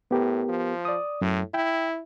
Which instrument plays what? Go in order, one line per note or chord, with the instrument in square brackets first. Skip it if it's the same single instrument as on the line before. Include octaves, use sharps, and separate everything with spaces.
[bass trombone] A2 [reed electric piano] B3 G4 A#4
[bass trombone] F3
[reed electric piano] D5 D#6
[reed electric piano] F#2 [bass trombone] A2
[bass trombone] E4 [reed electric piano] G5